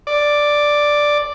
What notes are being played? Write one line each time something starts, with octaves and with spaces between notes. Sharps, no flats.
D5